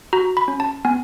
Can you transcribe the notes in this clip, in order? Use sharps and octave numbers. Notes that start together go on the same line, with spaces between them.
F#4 A#5
B5
C#4
A5
B3 G#5